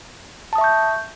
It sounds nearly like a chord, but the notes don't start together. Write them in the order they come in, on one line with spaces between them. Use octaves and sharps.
A5 D#6 E5 C#6 G6